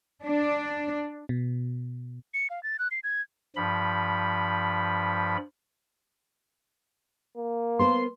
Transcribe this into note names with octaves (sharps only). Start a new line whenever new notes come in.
D4
B2
C#7
F5
A6
F#6
C7
G#6
G2 F3 B5
A#3
B3 A#4 C5 C6